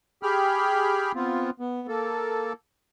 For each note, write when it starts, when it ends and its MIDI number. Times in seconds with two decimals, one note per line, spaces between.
0.23 1.12 67
0.23 1.12 68
0.23 1.12 79
0.23 1.12 83
0.23 1.12 89
1.15 1.50 59
1.15 1.50 60
1.15 1.50 65
1.60 1.87 59
1.88 2.53 58
1.88 2.53 69